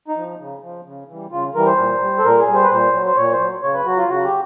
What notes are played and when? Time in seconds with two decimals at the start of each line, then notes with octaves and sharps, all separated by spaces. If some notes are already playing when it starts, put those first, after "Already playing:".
0.08 D#4
0.17 F3
0.39 C#3
0.62 F3
0.85 C#3
1.08 E3 G3
1.31 C#3 F4
1.54 E3 G3 A#4
1.66 C5
1.78 A#2
2.01 G3
2.18 A4
2.24 A#2 A#4
2.39 G#4
2.47 G3
2.55 C5
2.63 B4
2.70 A#2 C5
2.93 F#3
3.06 C5
3.16 A#2 C#5
3.32 C5
3.40 F#3
3.62 C#3 C#5
3.74 B4
3.86 F#3 F#4
3.97 F4
4.08 C#3 F#4
4.24 G4